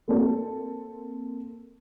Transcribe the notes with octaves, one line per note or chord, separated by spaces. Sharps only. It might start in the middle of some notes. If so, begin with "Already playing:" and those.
A#3 C4 A4